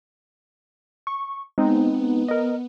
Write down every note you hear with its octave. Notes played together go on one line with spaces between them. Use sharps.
C#6
G#3 B3 C4 D#4
A#4 D#5